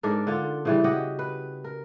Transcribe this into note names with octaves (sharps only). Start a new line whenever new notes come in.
G#2 D4 A4 A#4
D3 F4
C#3 E3 G3
F#4 G4 D#5 F#5
B4
A#4